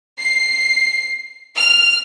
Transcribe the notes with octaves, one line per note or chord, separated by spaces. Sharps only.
C7
F6